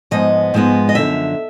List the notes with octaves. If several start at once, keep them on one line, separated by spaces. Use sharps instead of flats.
G#2 F3 G#3 B3 D#5
G#2 F3 G#3 B3
D#5
F#2 D3 F3 E5